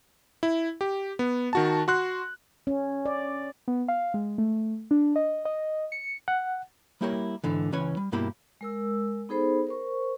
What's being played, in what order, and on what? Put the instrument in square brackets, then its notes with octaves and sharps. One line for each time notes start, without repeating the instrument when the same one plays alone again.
[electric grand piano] E4
G4
B3
D#3 F#4 A5
F#4 C6 F#6
[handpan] C#4
D5
[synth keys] B3
F5
G#3
A3
D4
D#5
D#5
C#7
[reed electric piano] F#5
[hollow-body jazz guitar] G3 A#3 E4 G4 A#4 C#5
G#2 D3 E3
C#2 E3 C#4 B4 C#5
G3
G2 B2 A#3 E4 G4 B5
[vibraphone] G#3 A#4 E6
B3 D#4 G#4 A4 C5 B5
A#4 C5 C#6